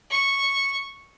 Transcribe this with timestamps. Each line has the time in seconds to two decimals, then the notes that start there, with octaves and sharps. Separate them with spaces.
0.10 C#6